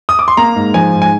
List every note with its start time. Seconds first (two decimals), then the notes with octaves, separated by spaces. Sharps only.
0.09 D#6
0.19 D6
0.28 C6
0.37 A#3 A#5
0.56 G#2
0.74 F3 G#5
0.93 G#2
1.02 G#5